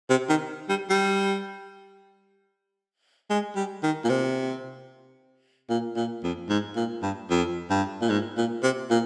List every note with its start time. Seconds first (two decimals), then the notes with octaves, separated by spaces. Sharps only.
0.10 C3
0.29 D#3
0.69 G3
0.90 G3
3.30 G#3
3.56 G3
3.83 D#3
4.04 A#2
4.10 C3
5.69 A#2
5.96 A#2
6.24 F2
6.49 G#2
6.76 A#2
7.02 G2
7.30 F2
7.70 G2
8.02 A#2
8.10 G#2
8.37 A#2
8.63 C3
8.90 A#2